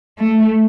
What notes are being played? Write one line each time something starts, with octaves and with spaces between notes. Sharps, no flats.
A3